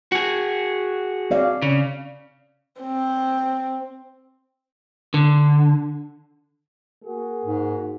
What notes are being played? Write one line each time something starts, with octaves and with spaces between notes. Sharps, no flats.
F#4 G#4
C4 D5 F5
C#3
C4
D3
A#3 F#4 G#4
G#2